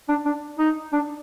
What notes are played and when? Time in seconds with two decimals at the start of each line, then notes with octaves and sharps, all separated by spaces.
0.09 D4
0.25 D4
0.59 D#4
0.93 D4